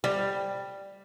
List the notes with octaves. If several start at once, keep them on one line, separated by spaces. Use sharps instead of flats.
G3